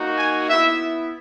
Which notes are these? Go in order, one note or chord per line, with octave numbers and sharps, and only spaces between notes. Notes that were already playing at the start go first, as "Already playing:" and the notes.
Already playing: A#3 D#4 F#4
G#5
B3 E4 E5